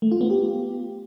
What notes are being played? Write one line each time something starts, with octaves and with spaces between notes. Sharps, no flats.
A3
F4
B3
G4